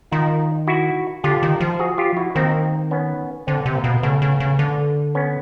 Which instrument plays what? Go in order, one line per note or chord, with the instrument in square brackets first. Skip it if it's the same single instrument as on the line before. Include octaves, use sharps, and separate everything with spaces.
[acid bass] D#3 [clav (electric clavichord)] D#4 F4
[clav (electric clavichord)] E4 F#4
[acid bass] D3 [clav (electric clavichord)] F4 G4
[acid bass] D#3
F3
[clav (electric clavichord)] F#4 G#4
F4 G4
E4 F#4
[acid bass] D#3 [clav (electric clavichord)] A#3 C4
[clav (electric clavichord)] B3 C#4
[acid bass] D3 [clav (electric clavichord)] C4
[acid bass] C3 [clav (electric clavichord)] B3
[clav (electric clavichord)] A#3 C4
[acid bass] B2
[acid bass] C#3 [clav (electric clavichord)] A3 B3
[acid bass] C#3
C#3
D3
[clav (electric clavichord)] B3 C#4